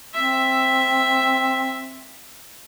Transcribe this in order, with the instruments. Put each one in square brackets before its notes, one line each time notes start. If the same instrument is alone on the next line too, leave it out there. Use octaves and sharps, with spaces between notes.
[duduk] C4 [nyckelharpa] E5